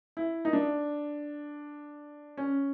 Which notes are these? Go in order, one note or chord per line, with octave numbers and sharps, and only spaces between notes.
E4
D#4
D4
C#4